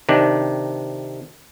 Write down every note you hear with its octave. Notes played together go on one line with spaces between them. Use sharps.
C3 D#3 D4